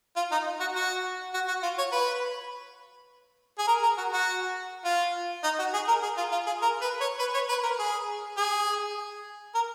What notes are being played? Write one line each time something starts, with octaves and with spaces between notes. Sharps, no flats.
F4
D#4
F#4
F#4
F#4
F#4
F4
C#5
B4
G#4
A#4
A#4
F#4
F#4
F4
D#4
F#4
G#4
A#4
G#4
F4
F4
G#4
A#4
B4
C#5
B4
C#5
B4
A#4
G#4
G#4
A#4